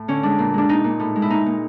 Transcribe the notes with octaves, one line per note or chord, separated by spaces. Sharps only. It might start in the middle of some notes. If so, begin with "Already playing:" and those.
Already playing: A2
D3 C#4
G#3 D4
A#2
G#3 D4
A#2 D#4
A#2
A2
G#3
E4
A#2 D#4
A#2